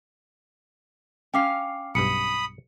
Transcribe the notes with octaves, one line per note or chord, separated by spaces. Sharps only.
C#4 F5 G5 D6 C7
B1 G2 B5 D#6 C#7